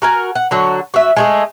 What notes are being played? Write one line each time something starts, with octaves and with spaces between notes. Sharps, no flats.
F#4 A#4 G#5
F#5
D3 F#3 F#4
F#4 E5
G#3 A3 G#4